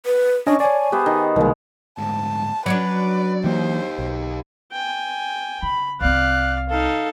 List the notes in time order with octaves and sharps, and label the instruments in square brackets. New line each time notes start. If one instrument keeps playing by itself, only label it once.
[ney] B4
[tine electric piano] C#4 C#5 D#5 [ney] D4 [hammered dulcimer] A5 C#6
[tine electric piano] C#5 D5 [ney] G#5
[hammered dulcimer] B3 C5 E5 [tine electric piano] G4
[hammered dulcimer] D#3
[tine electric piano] C2 D#3 A#3 [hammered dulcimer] B2 G#3
[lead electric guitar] D2 G#2 [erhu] A5
[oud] F#3 C#4 D4 [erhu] B4 [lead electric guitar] D5
[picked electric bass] E3 A#3 [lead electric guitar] D#4 G4 [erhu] C5
[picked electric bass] B1
[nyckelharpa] G5 G#5
[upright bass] C#3 [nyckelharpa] B5
[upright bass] C2 C4 [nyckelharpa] D5 F5 [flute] F#6
[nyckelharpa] D#4 A4 [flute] F5